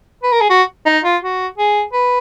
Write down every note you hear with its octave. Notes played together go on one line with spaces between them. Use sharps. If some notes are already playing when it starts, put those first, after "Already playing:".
B4
A#4
G#4
F#4
D#4
F4
F#4
G#4
B4